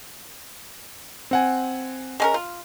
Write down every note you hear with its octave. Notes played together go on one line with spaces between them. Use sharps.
C4 F#5 G#5
G#3 C#4 A#4
F4